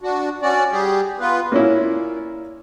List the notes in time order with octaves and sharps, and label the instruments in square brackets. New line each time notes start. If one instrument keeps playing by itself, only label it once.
[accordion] D4 F#4
C#4 F#4 D5
G3 G4 G#4
B3 F4 B4
[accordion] A#2 [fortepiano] A#3 C#4 E4